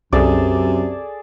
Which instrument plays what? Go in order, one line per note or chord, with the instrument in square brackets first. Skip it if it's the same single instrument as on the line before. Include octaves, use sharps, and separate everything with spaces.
[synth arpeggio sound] C2 [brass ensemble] F#2 [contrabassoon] C3 [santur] G#4 A4 D5